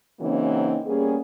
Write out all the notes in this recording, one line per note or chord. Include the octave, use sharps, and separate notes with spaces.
C#3 E3 F#3 A#3 C4 D#4
G3 A#3 B3 C#4 G#4